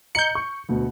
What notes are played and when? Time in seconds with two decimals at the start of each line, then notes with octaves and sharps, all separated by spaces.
0.15 D#5 A#5 G6 C#7 F#7
0.35 C#6
0.69 D2 B2